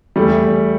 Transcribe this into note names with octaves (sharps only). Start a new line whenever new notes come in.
E2 G3 A3
E2